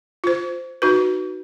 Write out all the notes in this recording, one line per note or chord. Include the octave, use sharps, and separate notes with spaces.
F4 C5
D#4 F#4 B4